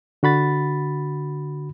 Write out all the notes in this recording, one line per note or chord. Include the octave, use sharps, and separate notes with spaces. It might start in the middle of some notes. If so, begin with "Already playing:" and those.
D3 F#4 B5 A6